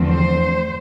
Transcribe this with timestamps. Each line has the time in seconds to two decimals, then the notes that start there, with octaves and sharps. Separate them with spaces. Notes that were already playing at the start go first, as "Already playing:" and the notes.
Already playing: E2 D3 F3 A3 C4
0.10 C5